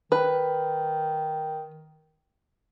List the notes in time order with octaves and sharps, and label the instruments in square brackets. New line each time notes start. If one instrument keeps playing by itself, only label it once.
[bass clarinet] D#3 [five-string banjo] B4